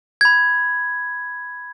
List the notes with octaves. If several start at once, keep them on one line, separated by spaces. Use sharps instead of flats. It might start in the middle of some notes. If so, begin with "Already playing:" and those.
B5 G#6